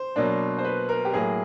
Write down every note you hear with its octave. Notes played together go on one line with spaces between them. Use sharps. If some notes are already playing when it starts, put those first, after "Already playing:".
Already playing: C5
B2 F#3 A#3 D4
C5
B4
A#4
G4
A2 F#3 A#3 G#4